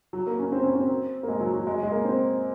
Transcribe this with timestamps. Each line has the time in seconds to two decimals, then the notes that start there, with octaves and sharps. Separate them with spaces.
0.13 F#3
0.27 A#3
0.39 C#4
0.52 C4
0.64 C#4
0.75 C4
1.23 A#3
1.29 G#3
1.41 F#3
1.54 F#3
1.67 G#3
1.83 G#3
1.92 A#3
2.05 C4